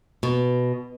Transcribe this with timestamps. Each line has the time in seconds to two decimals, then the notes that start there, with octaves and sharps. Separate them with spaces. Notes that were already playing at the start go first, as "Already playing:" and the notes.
0.23 B2